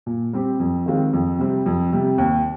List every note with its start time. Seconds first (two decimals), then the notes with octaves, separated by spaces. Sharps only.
0.06 A#2
0.33 G3 C4 G4
0.60 F2
0.86 D#3 G#3 C4 F4
1.13 F2
1.39 C3 G3 C4
1.66 F2
1.93 C3 G3
2.18 D#2